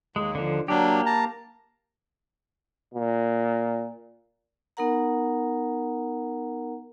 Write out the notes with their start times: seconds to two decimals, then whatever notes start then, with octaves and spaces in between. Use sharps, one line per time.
0.16 D#2 G#3
0.35 D3 F3
0.68 F#3 A#3 D4 G4
1.06 A5 A#5
2.94 A#2
4.77 B3 D#4 A#4 F#5 A#5